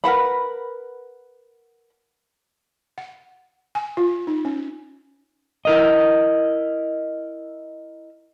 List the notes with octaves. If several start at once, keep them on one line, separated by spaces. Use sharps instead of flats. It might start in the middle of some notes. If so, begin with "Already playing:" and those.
A#4 B4 F#5 B5
F#5
G#5
F4
D#4
C#4
E4 A#4 D#5